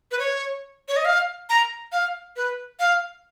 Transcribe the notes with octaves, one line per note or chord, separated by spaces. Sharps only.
B4
C#5
C#5
D#5
F5
A#5
F5
B4
F5